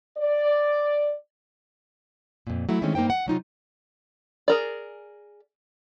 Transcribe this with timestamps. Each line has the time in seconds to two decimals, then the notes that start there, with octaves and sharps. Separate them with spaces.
0.18 D5
2.47 F2 A#2
2.69 F#3 A3 E4
2.82 D#3 E3 G#3 A3 C4 C#4
2.95 G2 A#3 D#4 C5 G5
3.10 F#5
3.26 C3 F#3 D#4 F4
4.48 G#4 A#4 D5